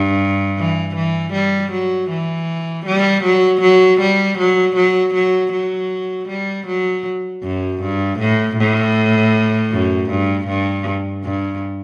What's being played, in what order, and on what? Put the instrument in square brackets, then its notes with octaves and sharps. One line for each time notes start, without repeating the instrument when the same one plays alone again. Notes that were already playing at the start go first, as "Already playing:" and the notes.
Already playing: [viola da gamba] G2
E3
E3
G3
F#3
E3
G3
F#3
F#3
G3
F#3
F#3
F#3
F#3
G3
F#3
F#2
G2
A2
A2
F#2
G2
G2
G2